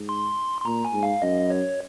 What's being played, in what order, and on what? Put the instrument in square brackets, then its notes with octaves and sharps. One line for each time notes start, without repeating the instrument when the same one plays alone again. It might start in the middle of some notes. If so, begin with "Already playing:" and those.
Already playing: [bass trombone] G#2
[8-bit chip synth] C6
C6
[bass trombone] A#2 [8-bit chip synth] A#5
[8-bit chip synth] G#5
[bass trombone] G#2
[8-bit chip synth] F5
[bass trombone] F#2 [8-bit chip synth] D#5
[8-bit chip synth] C#5